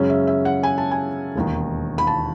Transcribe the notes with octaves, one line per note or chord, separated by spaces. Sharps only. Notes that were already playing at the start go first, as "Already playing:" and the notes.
Already playing: F#2 C#3 G#3 C#4
E5
E5
F#5
G#5
A5
G#5
E1 D#2 D#3
B5
A5